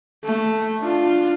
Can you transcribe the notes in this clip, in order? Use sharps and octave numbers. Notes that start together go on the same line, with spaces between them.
A3
D4 F4